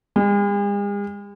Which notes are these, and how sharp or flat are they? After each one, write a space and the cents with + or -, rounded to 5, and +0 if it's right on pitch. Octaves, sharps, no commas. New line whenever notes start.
G#3 -45